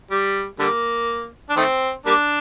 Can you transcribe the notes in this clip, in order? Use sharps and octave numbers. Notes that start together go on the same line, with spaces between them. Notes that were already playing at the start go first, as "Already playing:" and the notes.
G3
D3 G3 A#3
D4
D#3 A3 C4
G3 A#3 D4